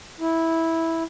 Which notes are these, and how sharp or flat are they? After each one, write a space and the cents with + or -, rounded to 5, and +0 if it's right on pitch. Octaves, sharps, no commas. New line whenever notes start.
E4 -10